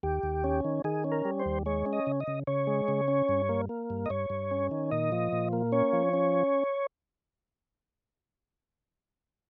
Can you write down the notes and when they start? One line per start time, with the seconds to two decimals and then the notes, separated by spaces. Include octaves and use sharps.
0.03 D#2 G4
0.23 D#2
0.44 C#4
0.65 D#3
0.84 D#3 G#4
1.04 C#4
1.12 A#4
1.25 G3
1.40 C5
1.46 D#2
1.66 G#3 C#5
1.86 C#4
1.93 D#5
2.07 C#3
2.20 D#5
2.27 C#3
2.47 C#3 C#5
2.67 G#3
2.88 C#3
3.08 C#4
3.29 G2
3.49 A#3
3.69 A#3
3.90 G2
4.06 D#5
4.10 G2 C#5
4.30 G2
4.51 C#4
4.71 D#3
4.91 A#2 D#5
5.12 F3
5.32 A#2
5.53 A#3
5.72 C#4 C#5
5.93 F3
6.13 C#4